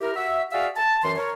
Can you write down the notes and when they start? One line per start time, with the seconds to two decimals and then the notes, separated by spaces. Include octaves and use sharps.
0.01 E4 G4 A#4
0.15 F#4 E5
0.52 F#4 G#4 D5 E5 F5
0.75 A5
1.03 F#2 E3 C6
1.17 A#4 C#5